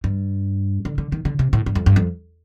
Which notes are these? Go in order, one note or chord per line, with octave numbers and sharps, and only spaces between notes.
G2
D3
D3
D#3
D3
C3
A2
G2
F2
G2
F2